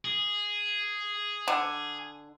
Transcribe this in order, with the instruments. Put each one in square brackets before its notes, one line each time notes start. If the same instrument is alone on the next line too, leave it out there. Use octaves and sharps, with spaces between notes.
[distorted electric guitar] G#4
[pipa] D3